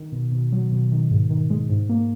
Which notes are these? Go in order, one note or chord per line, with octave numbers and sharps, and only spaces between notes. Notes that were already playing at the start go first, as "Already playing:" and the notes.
Already playing: D#3
B2
B2
F#3
B2
D#3
G#2
D#3
G#3
G#2
A#3